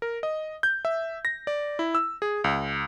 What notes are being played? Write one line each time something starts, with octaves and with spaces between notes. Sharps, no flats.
A#4
D#5
G6
E5
A#6
D5
E4
E6
G#4
C#2